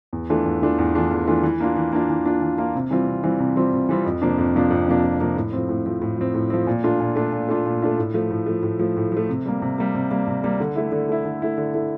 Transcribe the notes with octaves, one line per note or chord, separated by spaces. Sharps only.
E2
E3 A3 D4 F4
E2
E3 A3 D4 F4
E2
E3 A3 D4 F4
E2
E3 A3 D4 F4
E3
A#3 D4 F4
E3
A#3 D4 F4
E3
A#3 D4 F4
E3
A#3 D4 F4
C3
E3 G3 C4 F4
C3
E3 G3 C4 F4
C3
E3 G3 C4 F4
C3
E3 G3 C4 F4
F2
C3 F3 A#3 D4
F2
C3 F3 A#3 D4
F2
C3 F3 A#3 D4
F2
C3 F3 A#3 D4
A2
F3 C4
A2
F3 C4
A2
F3 C4
A2
F3 C4
A#2
A3 D4 F4
A#2
A3 D4 F4
A#2
A3 D4 F4
A#2
A3 D4 F4
A2
F3 A3
A2
F3 A3
A2
F3 A3
A2
F3 A3
C3
G3 A#3
C3
G3 A#3
C3
G3 A#3
C3
G3 A#3
D3
A3 E4
D3
A3 E4
D3
A3 E4
D3
A3 E4